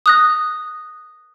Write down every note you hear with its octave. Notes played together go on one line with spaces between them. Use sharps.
D#6 F#6 A#6